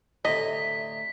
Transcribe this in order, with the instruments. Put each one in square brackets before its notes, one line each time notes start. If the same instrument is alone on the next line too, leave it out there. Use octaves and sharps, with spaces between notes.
[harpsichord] D2 A2 C3 [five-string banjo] D#5 [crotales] B6